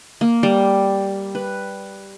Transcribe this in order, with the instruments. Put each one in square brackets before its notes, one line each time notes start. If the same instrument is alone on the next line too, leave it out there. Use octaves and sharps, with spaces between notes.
[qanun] A#3
G3
B4